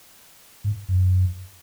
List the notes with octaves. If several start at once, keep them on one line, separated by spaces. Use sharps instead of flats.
G#2
F#2